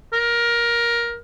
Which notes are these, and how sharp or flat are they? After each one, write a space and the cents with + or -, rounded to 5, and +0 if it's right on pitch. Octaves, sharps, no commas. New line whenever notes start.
A#4 +15